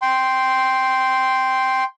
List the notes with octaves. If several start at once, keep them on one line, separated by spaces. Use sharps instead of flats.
G5 C6